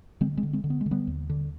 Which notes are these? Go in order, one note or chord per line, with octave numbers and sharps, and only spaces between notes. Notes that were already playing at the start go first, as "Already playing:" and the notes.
D3 G#3 C4
G#3 C4
D3
G#3 C4
D3
B3
G#3
D3
G3 B3
D#2
D3